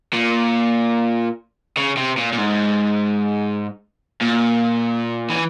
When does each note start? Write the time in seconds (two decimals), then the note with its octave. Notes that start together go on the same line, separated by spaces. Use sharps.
0.13 A#2
1.77 C#3
1.97 C3
2.17 A#2
2.33 A#2
2.38 G#2
4.22 A#2
5.30 E3